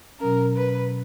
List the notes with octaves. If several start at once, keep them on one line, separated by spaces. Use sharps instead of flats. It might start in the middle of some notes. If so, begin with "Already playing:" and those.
B2 F#3 C#4 A#4
B4